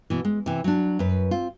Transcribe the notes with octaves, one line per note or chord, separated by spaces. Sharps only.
B2 E3
G#3
C3 E3
F#3 D4
F#2 B4
C4 F4